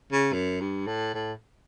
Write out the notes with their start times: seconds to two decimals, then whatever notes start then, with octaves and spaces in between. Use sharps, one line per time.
0.12 C#3
0.33 F#2
0.60 G2
0.87 A2
1.15 A2